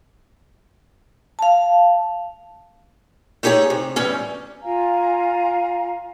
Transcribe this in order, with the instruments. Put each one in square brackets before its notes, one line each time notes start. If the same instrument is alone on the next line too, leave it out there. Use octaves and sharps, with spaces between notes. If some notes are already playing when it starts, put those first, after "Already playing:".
[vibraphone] F5 A5
[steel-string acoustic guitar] A3 D#4 G4 G#4 C#5
C3
E2 A2 G3 C#4 E4
[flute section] F4 F5 G#5 A#5